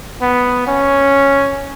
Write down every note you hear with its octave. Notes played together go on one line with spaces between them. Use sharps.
B3
C#4